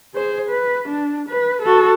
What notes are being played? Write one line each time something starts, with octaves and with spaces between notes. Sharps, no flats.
G#4 C5
B4
D4
B4
F#4 A4